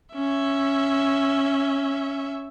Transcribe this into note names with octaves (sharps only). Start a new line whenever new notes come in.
C#4 E5